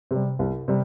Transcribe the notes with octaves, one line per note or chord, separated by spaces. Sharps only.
C3 G3
C2
C3 G3